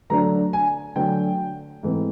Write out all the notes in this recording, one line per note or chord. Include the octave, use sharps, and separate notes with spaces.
D3 F#3 A3 D4 A#5
G#5
D3 F#3 A3 D4 G5
G#2 E3 A3 C4